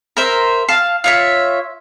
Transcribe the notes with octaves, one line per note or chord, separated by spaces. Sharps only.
A#4 C5 E5
F5 A5 F6
F4 C#5 E5